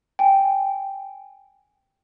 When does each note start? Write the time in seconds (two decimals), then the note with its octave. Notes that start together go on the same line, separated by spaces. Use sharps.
0.19 G5 G#5